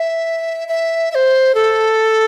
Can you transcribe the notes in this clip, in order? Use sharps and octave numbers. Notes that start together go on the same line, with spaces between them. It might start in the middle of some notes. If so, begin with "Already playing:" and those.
Already playing: E5
E5
E5
C5
A4